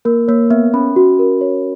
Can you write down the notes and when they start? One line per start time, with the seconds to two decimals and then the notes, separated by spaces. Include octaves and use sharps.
0.05 A#3 A#4
0.28 A#3 C#5
0.50 B3 E5
0.74 C#4 B5
0.96 F#4
1.19 A#4
1.41 C#5